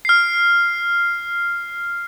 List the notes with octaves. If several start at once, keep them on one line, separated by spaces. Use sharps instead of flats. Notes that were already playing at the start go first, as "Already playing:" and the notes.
F6 C7